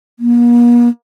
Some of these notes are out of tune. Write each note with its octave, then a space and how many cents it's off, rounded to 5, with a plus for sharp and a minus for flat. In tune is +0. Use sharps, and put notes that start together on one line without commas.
A#3 +45